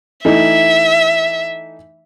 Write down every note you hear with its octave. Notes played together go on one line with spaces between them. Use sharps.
E3 A3 D#4 E5